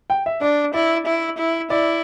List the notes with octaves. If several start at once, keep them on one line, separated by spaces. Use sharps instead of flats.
G5
E5
D4 D5
E4 D5
E4
E4
E4 D5